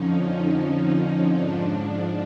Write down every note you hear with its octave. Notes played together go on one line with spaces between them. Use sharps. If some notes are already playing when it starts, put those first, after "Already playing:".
Already playing: F2 D3 F3 C#4 D#4
C#4
G#2 F3 D4